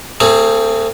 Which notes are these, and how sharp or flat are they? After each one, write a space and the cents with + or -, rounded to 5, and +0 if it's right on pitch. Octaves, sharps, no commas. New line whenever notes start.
A3 +40 C4 +0 G#4 +0